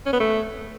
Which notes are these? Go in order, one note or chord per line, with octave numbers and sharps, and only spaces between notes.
C#4
B3
A3